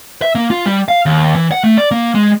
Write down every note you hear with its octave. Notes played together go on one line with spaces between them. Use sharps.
E5
A#3
F4
G3
F5
D#2
E3
F#5
A3
D5
A#3
G#3